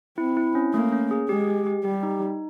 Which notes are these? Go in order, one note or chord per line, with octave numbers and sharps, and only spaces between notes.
C4 E4
E4
C#4
A3 A#3
C#4
G#4
G#3 G4
G4
G4
G3 G4
D#4
D#4